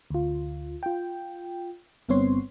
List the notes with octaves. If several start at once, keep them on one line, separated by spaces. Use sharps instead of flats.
D2 F4
F4 G5
G1 G2 B3 C4 C#5 C6